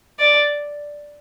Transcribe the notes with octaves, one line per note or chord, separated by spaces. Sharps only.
D5